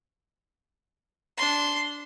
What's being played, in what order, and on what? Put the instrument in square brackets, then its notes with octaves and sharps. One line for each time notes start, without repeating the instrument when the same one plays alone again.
[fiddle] D4 C6